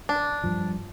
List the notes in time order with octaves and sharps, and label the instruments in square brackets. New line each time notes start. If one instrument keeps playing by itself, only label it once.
[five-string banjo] D4
[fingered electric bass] G2 F3